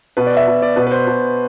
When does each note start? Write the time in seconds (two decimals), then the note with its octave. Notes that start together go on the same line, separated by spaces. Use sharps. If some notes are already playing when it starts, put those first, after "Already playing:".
0.17 B2 B4
0.27 D5
0.37 E5
0.48 B2
0.62 D5
0.76 B2 B4
0.87 B4
0.91 C5
1.07 B2